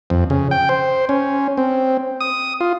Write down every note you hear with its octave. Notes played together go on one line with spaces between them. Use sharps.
F2
C#3
G5
C5
C#4
C4
D#6
F4